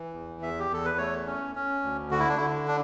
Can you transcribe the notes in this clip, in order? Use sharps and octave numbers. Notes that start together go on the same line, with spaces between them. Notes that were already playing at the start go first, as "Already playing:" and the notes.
Already playing: E3
E2
E2 E5
G4
E2 A4
B4
A3 C#5
C#4
C#4
D2
D3 F#4
E4
D4
D3 E4
D4